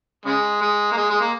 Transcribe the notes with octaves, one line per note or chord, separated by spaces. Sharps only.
C#3 G#3
G#3
A#3
G#3
G#3
A#3